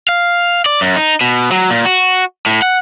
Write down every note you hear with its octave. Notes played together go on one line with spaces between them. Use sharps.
F5
D5
F#2
D#4
B2
F#3
A#2
F#4
A2
F#5